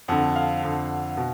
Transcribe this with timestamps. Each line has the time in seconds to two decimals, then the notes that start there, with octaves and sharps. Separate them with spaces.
0.08 F2 D3 F#5
0.35 F5
0.63 F2 D3
1.17 B2